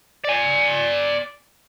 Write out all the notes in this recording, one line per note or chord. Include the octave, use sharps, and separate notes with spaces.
D5 G#5